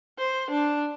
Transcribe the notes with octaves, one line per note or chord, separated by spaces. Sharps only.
C5
D4